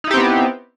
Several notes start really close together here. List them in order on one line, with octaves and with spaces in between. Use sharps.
D#4 E4 G4 C4 B3